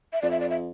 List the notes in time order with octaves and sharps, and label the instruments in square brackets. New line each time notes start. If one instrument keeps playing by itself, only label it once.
[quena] E5
[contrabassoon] F2 [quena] D5
[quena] E5
D5
E5